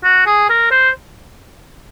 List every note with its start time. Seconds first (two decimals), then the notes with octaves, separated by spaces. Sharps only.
0.04 F#4
0.26 G#4
0.49 A#4
0.71 C5